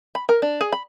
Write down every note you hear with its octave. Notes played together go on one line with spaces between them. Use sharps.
B5
A#4
D4
G#4
B5